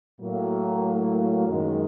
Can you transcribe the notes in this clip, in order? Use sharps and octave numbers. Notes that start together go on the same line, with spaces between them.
A2 F#3 A#3
F#2 D#3 G#3